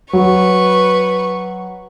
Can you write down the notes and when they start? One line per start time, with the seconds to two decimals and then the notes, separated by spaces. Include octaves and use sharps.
0.13 F#3 B4 C#6